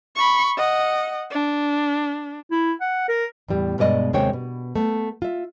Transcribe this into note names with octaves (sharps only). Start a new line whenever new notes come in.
B5 C#6
D#5 F#5
D4
E4
F#5
A#4
E2 A2 G3
G2 B2 G#3 D5 D#5
D#2 C3 G#3 C5 C#5 G5
B2
A3 B3
F4 E5